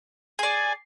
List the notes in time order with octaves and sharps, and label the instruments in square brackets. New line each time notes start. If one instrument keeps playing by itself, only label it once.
[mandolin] G#4 D5 [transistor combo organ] G#5